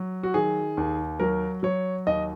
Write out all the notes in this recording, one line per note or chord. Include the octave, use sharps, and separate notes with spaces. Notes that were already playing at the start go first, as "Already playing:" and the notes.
Already playing: F#3
F#4
D#3 G#4
D#2
F#3 A#4
F#3 C#5
D#2 D#5